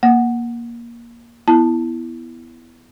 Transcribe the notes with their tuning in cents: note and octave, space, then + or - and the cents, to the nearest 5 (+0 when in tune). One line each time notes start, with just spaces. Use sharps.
A#3 +15 F#5 +0
B3 +0 E4 +5 A5 +0